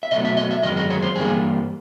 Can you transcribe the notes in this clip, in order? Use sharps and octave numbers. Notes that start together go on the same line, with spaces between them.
E5
B2 F#3 A3 D#5
E5
D#5
E5
F#2 D#3 G#3 D#5
D#5
C#5
C5
G2 E3 G3 A#3 G#4